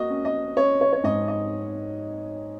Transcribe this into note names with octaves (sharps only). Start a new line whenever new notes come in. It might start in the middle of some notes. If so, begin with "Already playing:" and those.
Already playing: A#3 F#4 D#5
C#4
D#5
C#4 C#5
C#5
C#5
G#2 D#5
D#5